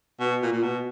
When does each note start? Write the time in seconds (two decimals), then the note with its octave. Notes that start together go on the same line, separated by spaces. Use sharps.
0.20 B2
0.42 A#2
0.52 A#2
0.63 B2